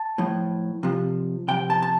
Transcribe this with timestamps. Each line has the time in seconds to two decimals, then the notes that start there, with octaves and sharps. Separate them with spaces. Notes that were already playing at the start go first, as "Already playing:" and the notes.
Already playing: A5
0.18 A2 F3
0.83 C3 F3
1.48 C3 F3 G5
1.70 A5
1.82 A5